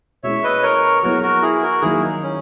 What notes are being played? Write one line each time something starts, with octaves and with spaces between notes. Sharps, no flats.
B2 G#3 C#4 E4 C#5 E5
B4 D#5
A#4 C#5
F#3 B3 E4 F#4 G#4 A#4
F#4 A#4
E4 G#4
F#4 A#4
D#3 F#3 A#3 E4 G#4
D#4
C#4